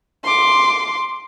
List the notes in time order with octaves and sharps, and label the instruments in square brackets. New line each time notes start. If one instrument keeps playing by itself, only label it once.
[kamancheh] C6 D6